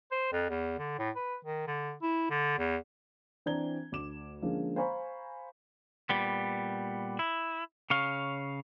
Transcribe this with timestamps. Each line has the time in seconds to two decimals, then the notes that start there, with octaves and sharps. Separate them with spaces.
0.11 C5
0.32 F2
0.50 E2
0.79 D3
0.99 A2
1.16 B4
1.45 D#3
1.67 D3
2.02 E4
2.30 D3
2.59 E2
3.46 E3 C4 D4 A#5 G#6 G7
3.92 D2 D6 E7
4.42 D3 F3 G#3 A#3 C#4
4.76 C5 F5 G#5 A#5 B5 C#6
6.09 A#2 G3 B3
7.19 E4
7.90 C#3 C#5 F5